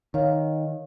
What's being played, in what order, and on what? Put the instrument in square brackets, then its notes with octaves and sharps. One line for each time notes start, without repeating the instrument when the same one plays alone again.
[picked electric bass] D#3 [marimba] C#5 F5